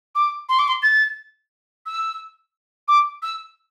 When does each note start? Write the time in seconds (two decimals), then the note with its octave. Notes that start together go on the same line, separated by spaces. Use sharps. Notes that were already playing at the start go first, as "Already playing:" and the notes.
0.15 D6
0.49 C6
0.59 D6
0.68 C6
0.82 A6
1.86 E6
2.88 D6
3.22 E6